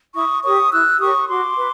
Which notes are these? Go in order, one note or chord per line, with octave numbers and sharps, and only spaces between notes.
E4 C#6 D#6
G4 A#4 C#5 C#6 D#6
E4 E6 F#6
G4 A#4 C#5 C#6 D#6
F#4 C6 D6
B4